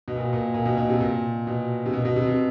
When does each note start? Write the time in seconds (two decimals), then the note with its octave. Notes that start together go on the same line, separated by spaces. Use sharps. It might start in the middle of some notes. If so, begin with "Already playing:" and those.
0.08 B2
0.16 A#2
0.33 A#2
0.54 A#2
0.65 B2
0.77 B2
0.89 C3
1.00 A#2
1.47 B2
1.86 C3
1.93 B2
2.05 B2
2.16 C3
2.28 C3